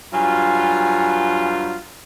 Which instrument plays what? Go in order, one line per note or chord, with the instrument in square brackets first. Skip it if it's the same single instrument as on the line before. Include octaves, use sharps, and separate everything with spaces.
[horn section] G2 F#3 F4 [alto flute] G#5